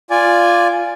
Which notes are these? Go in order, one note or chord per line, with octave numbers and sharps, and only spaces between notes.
F4 D5 G#5